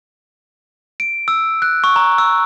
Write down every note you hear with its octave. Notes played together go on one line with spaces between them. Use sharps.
D7
E6
F#6
C#6
A#5
E6